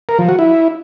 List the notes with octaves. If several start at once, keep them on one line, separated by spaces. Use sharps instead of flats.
A#4
F3
F#4
E4